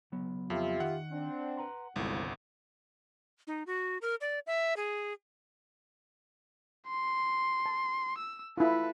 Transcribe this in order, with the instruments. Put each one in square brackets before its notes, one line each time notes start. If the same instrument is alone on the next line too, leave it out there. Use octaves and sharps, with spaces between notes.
[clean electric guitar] C#2 F#3 B3
[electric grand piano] F2 [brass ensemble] F4 G4 E5
[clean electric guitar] D#3 [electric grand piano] F#5
[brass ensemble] C4 D4
[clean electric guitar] B4 A#5 C6
[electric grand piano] G1 C2 [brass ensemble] F2 D#3 [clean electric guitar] G#3 E4 F#4
[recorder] D#4
F#4
A#4
D5
E5
G#4
[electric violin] C6
[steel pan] A5
[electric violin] E6
[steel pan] E4 F4 [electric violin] A4 B4